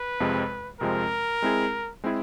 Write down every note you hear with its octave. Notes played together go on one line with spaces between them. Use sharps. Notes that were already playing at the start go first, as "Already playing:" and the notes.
Already playing: B4
F2 C3 F3 G#3 C4
F2 C3 F3 G#3 C4 A#4
G#3 C4 E4 G#4
G#3 C4 E4 G#4